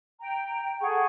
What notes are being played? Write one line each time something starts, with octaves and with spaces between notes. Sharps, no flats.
G5 A#5
G#4 A4 F#5 C#6